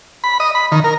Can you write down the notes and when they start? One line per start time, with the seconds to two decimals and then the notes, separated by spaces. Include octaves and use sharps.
0.24 B5
0.40 D#5
0.55 B5
0.72 D#3
0.84 A#4